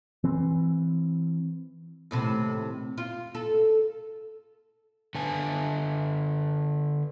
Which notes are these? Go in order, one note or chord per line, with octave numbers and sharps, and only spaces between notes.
E3 C4
D#2 A2 C3
F4
A4
D3 B4 G#5 A5